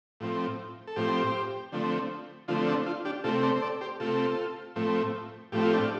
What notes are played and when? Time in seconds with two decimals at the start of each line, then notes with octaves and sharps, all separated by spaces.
0.20 A2 F3 C4
0.87 A4
0.96 A2 F3 C4 G4 C5
1.72 D3 F3 A3 C4
2.48 D3 F3 A3 C4 F4
2.67 D4
2.86 F4
3.05 D4 G4
3.24 C3 A3 C4 F4 A4
3.43 A4 D5
3.56 C5
3.62 A4 D5
3.81 G4 C5
4.00 C3 A3 C4 F4 A4
4.76 A2 F3 A3 C4
5.52 A2 F3 A3 C4 G4
5.63 F4
5.73 D4 G4